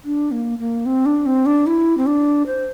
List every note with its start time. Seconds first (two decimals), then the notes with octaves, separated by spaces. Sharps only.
0.05 D4
0.31 A#3
0.59 A#3
0.86 C4
1.06 D4
1.26 C4
1.46 D4
1.67 E4
1.97 C4
2.06 D4
2.47 C5